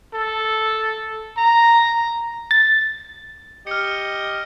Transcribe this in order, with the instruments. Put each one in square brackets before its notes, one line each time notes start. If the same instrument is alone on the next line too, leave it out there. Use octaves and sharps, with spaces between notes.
[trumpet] A4
A#5
[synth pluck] A6
[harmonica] G4 D#5 [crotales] F6 C#7